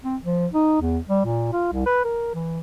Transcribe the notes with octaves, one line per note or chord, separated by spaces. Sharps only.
C4
F3
D#4
E2
G3
A#2
F4
C2
B4
A#4
E3